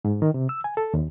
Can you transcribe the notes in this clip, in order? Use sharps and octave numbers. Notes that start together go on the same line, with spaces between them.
G#2
D#3
C3
E6
G#5
A4
D#2